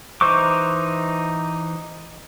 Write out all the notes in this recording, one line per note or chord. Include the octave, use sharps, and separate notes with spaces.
E3 D#4 C5 C#6 D6